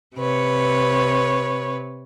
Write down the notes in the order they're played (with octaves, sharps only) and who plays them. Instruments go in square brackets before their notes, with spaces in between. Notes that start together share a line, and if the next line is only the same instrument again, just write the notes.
[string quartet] C3 B4 C#5